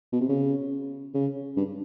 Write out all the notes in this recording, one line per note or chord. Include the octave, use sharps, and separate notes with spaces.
B2
C3
C#3
C#3
G2